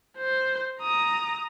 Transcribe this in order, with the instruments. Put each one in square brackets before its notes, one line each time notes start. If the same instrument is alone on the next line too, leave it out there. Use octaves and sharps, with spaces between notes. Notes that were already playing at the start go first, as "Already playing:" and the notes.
[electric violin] C5
A#5 D#6